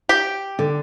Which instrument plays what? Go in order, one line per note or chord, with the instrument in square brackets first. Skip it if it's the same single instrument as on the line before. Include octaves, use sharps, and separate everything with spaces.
[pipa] G4
[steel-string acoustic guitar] D3